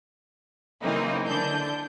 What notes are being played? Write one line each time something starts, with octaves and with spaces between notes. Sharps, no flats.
C#3 E3 F#3 A#3 C4 D#4
D3 D4 G6